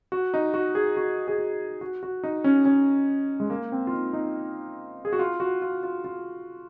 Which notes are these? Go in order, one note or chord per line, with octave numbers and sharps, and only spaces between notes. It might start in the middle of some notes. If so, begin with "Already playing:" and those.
F#4
D#4
F#4
G#4
F#4
G#4
F#4
F#4
F#4
D#4
C#4
C#4
G#3
A#3
C4
F4
D#4
D#4
G#4
F#4
F4
F#4
F4
F4
F4